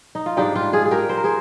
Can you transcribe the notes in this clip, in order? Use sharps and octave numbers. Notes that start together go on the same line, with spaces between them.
D#4
F4
G#2 G3 D4 D#4 G4
F4
F4 G#4
G#4
G4 A#4
C5
A#4
G#4 C5